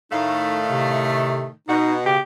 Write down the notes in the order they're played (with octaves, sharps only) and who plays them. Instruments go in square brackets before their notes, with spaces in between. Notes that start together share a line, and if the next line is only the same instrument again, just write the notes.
[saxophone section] A2 D#3 A3 [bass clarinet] D#4 [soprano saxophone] F5
[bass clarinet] C3
[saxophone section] B2 [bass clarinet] D#4 [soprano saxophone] F#4
[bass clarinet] C#3 [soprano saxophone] G4